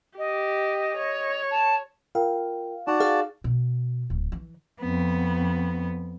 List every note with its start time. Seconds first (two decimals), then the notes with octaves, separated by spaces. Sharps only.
0.18 G4 D#5
0.97 C#5
1.50 A5
2.15 F4 A#4 F5 G5
2.87 D#4 F#4 D5 A5
3.00 G#4 F5
3.44 B2
4.10 D1
4.32 E3
4.81 F2 B3